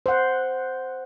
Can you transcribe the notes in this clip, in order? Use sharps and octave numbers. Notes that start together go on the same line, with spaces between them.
C5 F#5